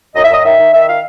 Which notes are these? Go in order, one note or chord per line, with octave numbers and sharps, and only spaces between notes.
F#2 D#5
E5
F#2 D#5
D#3 E5
D#3
D#3 E5
F5